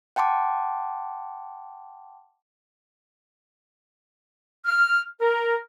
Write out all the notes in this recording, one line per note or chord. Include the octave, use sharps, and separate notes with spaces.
F#5 G5 A5 C6 D6
F6
A#4